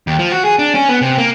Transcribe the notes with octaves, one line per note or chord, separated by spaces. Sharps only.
D#2
F3
F#4
G#4
D4
C#4
B3
C3
A#3